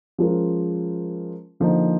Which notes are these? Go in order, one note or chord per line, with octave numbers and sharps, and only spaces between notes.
F3 G#3 C#4 F4 A#4
D3 F3 A#3 D#4